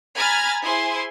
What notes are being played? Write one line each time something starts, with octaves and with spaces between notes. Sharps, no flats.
G#5 A#5 B5 F6 G#6 A6
E4 G#4 C5 G#5 C6